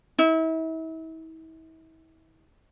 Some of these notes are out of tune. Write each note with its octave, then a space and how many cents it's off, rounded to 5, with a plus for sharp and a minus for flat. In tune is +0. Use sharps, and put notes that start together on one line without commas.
E4 -40